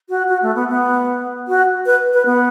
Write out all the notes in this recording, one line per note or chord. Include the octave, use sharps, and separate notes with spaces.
F#4
F#4
A3
B3
B3
F#4
B4
B4
B3